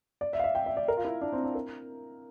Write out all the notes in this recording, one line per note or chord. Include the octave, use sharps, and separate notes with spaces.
D5
E5
F5
E5
G5
E5
D5
A#4
F4
E4
D4
C4
D4
A#4